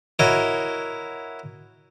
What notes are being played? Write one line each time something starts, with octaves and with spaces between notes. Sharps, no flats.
E4 F#4 A#4 C#5 D#5